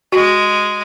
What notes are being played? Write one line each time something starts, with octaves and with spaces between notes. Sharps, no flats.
G#3 F#4